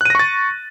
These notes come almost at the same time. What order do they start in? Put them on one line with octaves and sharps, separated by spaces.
F#6 D#7 A#6 C#6 A6